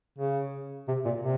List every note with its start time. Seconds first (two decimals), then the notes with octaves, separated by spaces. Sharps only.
0.18 C#3
0.88 C3
1.05 A#2
1.22 C3